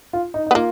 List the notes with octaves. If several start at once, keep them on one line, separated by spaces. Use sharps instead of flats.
F4
D#4
D#4
B3
A#3 F4